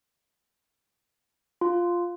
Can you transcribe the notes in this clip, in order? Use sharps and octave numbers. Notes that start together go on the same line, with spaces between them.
F4